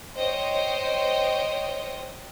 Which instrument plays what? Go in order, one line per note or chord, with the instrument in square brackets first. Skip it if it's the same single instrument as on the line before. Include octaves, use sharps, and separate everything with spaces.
[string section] C5 C#5 D#5 G5